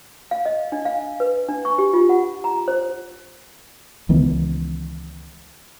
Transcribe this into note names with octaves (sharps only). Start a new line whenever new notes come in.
F5
D#5
D4
F5
B4
D4
C#6
G4
F4
F#5
A#5
C5
C#2 D#3 E3 B3